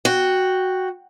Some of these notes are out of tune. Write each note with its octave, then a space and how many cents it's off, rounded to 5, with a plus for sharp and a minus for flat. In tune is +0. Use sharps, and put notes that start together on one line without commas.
F#4 +0 G5 +0